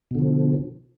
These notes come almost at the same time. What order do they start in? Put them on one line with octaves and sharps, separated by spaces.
B2 D3 F3